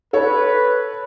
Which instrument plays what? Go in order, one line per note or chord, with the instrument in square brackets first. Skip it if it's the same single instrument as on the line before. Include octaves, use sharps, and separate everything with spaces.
[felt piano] A4 C#5 [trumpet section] B4